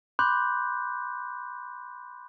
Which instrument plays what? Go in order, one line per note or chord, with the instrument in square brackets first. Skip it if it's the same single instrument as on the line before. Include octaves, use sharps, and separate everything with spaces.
[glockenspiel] B5 C6 D6 F#6 G6